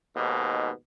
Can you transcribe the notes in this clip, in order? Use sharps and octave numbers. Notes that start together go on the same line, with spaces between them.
D#2 G#2 B2